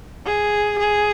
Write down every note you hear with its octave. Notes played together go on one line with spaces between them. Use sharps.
G#4
G#4